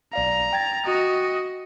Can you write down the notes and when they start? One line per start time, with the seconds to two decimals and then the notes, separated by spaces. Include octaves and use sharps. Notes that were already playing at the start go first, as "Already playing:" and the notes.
0.13 B1 D5 F5 A#5
0.53 G5 G#6 A6
0.86 F#4 D#5